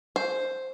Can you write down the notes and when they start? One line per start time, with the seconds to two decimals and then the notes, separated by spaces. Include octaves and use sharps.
0.16 C5